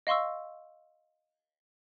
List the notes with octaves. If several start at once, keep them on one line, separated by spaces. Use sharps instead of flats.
D#5 F5 C6 C#6 E6